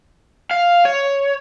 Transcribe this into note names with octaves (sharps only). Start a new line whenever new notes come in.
F5
C#5